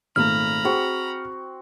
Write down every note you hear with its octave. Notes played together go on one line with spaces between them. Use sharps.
G#1 A#2 A3 A#5 B5 F6
C4 F#4 G#4